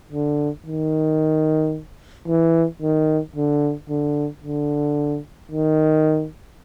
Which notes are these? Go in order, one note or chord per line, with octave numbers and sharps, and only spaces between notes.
D3
D#3
E3
D#3
D3
D3
D3
D#3